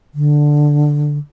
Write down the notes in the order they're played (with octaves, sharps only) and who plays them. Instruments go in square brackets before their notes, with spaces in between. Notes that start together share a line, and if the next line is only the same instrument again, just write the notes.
[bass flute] D3